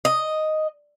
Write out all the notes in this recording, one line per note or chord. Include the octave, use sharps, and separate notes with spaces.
D#5